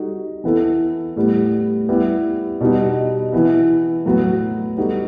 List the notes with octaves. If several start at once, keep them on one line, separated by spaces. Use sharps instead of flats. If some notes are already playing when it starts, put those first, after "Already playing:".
Already playing: G3 D#4 F#4 A4
E3 B3 E4 A4
A2 G3 B3
G3 B3 E4 G4
B2 G3 B3 D#4
E3 B3 E4
A2 F#3 B3 F#4
G3 B3 D#4 F#4 A4